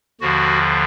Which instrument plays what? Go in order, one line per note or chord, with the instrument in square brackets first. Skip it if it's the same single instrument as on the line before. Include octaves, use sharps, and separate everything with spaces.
[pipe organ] D#2 D3 F3 F#4